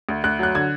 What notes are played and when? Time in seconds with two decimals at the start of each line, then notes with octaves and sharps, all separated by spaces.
0.09 D2
0.24 D2 F#6
0.39 F#3 F#6
0.55 D3 G#6